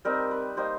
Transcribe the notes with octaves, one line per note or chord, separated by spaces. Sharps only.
G3 C4 D#4 A#4
B4
G3 A#3 D#4 C5